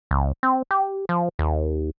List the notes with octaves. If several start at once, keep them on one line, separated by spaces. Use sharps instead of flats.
C#2
C4
G4
F3
D#2